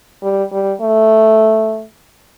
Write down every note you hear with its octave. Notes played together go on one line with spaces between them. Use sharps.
G3
G3
A3